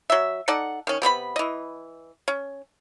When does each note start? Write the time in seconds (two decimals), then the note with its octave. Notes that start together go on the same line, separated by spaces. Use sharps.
0.10 F#3 E5
0.48 D#4 A4 D5 F#5
0.87 D#3 C#4
1.02 C3 B3 C4 B5
1.36 E3 D#5
2.28 C#4